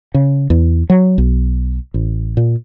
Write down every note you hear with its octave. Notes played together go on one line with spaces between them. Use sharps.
C#3
E2
F#3
B1
A1
A#2